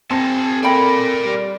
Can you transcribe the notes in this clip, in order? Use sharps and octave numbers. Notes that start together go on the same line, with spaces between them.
C4 E4 G#4 A5 A#6
E4 A4 A#4 D5 G5 B5
G3